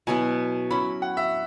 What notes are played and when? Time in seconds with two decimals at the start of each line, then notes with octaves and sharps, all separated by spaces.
0.07 B2 F#3 B3 E4 G#5
0.70 F#3 C#4 E4 B5
1.02 F#5
1.17 E5